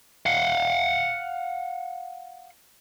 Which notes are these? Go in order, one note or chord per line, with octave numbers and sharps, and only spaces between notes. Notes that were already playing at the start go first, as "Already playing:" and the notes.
F5 F#5